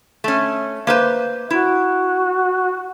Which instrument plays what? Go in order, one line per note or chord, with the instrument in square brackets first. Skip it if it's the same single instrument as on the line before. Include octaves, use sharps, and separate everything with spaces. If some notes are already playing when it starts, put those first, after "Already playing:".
[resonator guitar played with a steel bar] A3 C#4
A#3 B4 C5
[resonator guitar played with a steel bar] E4 [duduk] F#4